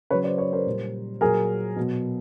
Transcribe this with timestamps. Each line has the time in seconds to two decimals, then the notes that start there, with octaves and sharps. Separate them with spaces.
0.11 C#3 F#3 B4 C#5
0.24 C5 D5
0.38 B4 C#5
0.53 A#4 C5
0.66 A#2 G3
1.21 A#2 F#3 G#4 A#4
1.76 B2 F#3